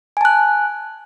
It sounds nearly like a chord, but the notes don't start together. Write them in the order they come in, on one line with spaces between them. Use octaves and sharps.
G#5 A5 F#6